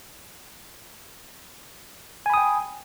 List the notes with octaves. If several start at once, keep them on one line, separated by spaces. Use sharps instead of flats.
G5 G#5 B5 D#6